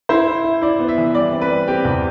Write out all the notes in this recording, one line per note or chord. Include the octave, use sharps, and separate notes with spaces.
E4 C5
E4
E4
E4 D5
B3
E5
E3
G3 D5
C4
B4
G3
C4 G4
E2